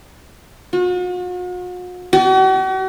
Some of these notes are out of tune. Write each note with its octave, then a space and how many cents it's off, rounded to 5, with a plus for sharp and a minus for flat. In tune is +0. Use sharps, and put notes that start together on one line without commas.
F#4 -45
F#4 +45